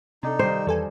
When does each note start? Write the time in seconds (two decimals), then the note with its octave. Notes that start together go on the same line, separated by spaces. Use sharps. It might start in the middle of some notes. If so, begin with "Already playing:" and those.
0.23 C3 D4 D#4 A4
0.39 G2 D#3 G3 C5
0.67 E2 A4 G#5